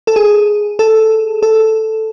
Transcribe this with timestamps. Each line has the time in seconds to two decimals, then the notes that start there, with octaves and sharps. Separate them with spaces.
0.07 A4
0.16 G#4
0.79 A4
1.43 A4